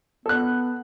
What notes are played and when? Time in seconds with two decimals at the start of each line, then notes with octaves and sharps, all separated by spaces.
0.26 B3 A4 F#6